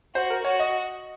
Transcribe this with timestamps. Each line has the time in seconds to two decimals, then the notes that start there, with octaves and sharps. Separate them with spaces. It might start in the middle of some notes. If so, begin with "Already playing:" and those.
0.15 F#4 C5
0.30 A#4
0.45 F#4 C#5
0.59 D#5